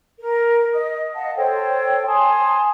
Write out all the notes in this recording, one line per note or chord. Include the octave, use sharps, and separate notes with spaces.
A#4
D#5 D#6
D#5 F5 F#5 A5
A4 C5 C#5 G5
G#5 A5 C6 D#6